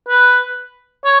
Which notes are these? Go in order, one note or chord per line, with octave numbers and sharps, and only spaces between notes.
B4
C#5